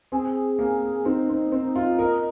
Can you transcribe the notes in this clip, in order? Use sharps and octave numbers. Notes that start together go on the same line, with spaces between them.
C4 G#4
A#3
C4 D#4
C4
C4
F4
A#4 D#5